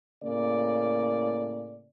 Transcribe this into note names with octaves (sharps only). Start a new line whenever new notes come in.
A2 C#3 A#3 D5